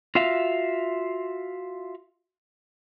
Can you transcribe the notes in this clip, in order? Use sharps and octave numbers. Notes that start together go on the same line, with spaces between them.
F4 F#4 E5 F5